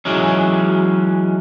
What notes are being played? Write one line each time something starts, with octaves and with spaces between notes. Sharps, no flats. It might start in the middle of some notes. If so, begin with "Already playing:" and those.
E3 F#3 G#3 C#4